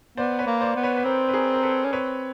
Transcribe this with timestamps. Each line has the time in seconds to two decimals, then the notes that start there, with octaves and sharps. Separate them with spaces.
0.17 B3 C5 D5
0.39 B4 C#5
0.46 A#3
0.61 C5 D5
0.76 B3
0.83 B4 C#5
0.97 B4
1.05 C4 A#4 C5
1.29 B4
1.33 G#4 A#4
1.54 A#4
1.63 A4 B4
1.84 C#4
1.93 C4 B4 C#5